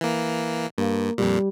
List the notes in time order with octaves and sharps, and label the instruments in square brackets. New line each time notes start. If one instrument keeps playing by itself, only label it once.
[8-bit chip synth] E3 A#3
[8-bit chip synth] G2 [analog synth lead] A#3
[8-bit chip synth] F2 A#2 [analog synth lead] G3